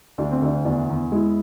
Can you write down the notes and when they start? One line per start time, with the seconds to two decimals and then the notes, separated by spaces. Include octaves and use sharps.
0.18 D2 D4
0.32 C4
0.42 D2 D4
0.65 E2 D4
0.89 E2
1.12 G#3 E4